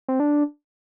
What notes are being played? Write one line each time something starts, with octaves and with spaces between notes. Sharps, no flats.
C4
D4